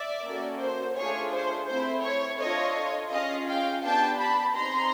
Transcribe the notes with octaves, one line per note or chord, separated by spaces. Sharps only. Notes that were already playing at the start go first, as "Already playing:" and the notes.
Already playing: D5 E5
A#3 C#4 F#4 A4
C5
A3 D4 F4 G#4 C#5
C5
A3 C4 E4 C5
C#5
D4 F4 A4 C#5 D#5
C#4 F4 G#4 D#5 F5
F5 G5
B3 D4 G4 G5 A5
A5 B5
C4 D#4 G#4 A#5 C6